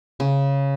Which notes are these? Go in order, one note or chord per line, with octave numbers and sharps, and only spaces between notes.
C#3